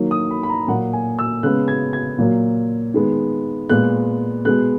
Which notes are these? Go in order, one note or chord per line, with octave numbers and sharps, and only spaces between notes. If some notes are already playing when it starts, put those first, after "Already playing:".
Already playing: D#3 F#3 A#3
D#6
B5
B5
A#5
A#2 F#3 A#3 F#5
G#5
E6
C#3 G#3 B3 F#6
G#6
G#6
A#2 F#3 A#3
D#3 G#3 B3
A#2 G#3 B3 F#6
B2 G#3 B3 F#6